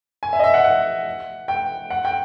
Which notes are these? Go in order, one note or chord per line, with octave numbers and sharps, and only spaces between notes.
G#5
E5
D#5
E5
F#5
F#5
G5
F#5
G5